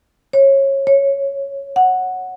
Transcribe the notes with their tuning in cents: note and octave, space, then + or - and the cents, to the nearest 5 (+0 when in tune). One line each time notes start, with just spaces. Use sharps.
C#5 -20
C#5 -5
F#5 -5